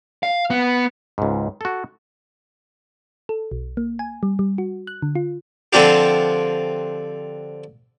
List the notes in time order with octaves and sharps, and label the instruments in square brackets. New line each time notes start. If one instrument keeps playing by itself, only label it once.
[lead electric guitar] F5
B3
[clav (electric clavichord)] C#2 G#2
F#4 A4
[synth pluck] A4
B1
A#3
G#5
G3
G3
F#4
F#6
D3
F4
[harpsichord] D3 F3 C4 D4 F4 G4